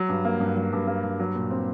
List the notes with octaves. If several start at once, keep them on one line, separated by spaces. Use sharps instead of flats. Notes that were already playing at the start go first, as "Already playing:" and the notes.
Already playing: F#3
G2
A#3
G2
F#3
G2
A#3
G2
F#3
A#2
C4